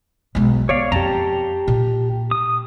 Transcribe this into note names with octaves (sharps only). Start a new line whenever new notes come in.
B1 G#3
B3 C#5 D5 F5
F2 G4 A5 A#5
A#2
D#6